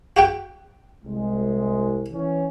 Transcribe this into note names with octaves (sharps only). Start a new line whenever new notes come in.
F#4 G4 G5
C2 G#3
E3 C#4